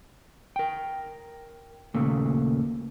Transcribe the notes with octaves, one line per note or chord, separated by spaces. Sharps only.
A#4 G5
D#2 A#2 C#3 A3 A#3